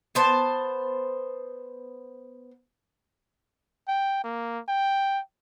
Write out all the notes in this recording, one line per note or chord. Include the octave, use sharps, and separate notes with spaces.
B3 C5 A5
G5
A#3
G5